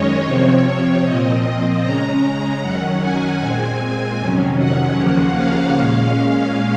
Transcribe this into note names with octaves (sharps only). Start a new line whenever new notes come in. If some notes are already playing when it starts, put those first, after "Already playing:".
Already playing: F#2 D#3 G#3 C#4 C#5 D#5
C3 F3 C4 C#5
A#2 F3 C4 D#5
C#3 G#3 C#4 A#5
F#2 D#3 F#3 C#4 F#5
G#5
A#2 G#3 C4 G#5
F2 C3 D#3 F#3 C#4
F#5
D#2 C#3 F3 A#3 C#4
F5
A#2 G#3 C#4 F5